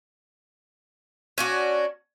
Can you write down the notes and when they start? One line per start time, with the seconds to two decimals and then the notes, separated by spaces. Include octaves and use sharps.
1.38 C#4 D4 F#4